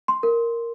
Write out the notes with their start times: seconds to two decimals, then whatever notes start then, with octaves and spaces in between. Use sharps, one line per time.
0.08 C6
0.23 A#4